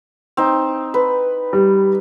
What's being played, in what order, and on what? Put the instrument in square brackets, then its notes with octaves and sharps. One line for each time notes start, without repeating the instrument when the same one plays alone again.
[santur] C4 D#4
B4
[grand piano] G3